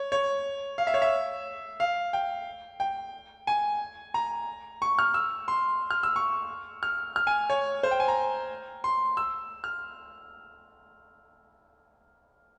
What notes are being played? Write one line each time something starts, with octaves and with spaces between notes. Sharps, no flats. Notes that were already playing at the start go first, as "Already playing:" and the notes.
Already playing: C#5
C#5
F5
E5
C#5
E5
F5
G5
G5
G#5
A#5
C#6
F6
E6
C6
F6
E6
C#6
F6
F6
G#5
C#5
C5
G5
G#5
A#5
C6
E6
F6